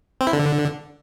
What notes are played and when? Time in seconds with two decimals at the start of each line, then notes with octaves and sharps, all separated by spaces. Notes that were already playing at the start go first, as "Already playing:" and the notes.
0.21 C4
0.27 E4
0.33 D3